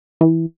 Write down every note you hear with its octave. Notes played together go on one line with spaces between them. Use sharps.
E3